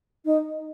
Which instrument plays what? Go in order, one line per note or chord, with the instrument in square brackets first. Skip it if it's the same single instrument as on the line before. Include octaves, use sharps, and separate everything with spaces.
[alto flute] D#4